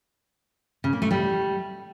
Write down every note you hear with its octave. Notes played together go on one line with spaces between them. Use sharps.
C#3
A#3
A3
G3